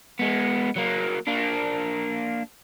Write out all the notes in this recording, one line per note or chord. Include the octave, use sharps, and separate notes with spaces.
G#3 B3
F#3 A#3
A#3 D4